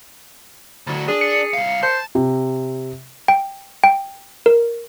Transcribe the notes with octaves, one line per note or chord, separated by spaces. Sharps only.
D2 F#3
D4 G#4
C#7
C2 F5
C5 A5
C3
G5
G5
A#4